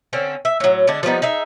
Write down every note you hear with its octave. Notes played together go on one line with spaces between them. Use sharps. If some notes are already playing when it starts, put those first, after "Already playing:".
D3 C4 C#4
E5
A2 F#3
D3 G#3 D4
F3 G3 B3 D#4
D#4 G#4 E5